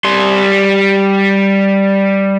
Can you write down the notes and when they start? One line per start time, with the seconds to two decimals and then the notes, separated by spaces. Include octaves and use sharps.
0.05 G3 C6